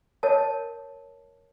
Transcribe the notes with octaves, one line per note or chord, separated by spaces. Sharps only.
A#4 C#5 D#5 A5